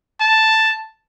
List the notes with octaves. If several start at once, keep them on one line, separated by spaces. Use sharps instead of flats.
A5